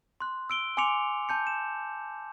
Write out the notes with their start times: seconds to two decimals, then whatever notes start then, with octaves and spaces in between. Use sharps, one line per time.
0.20 C6 F#6
0.50 E6 D7 G7
0.77 G#5 C6 D6 C#7 F7
1.29 A5 G6 C#7
1.47 E7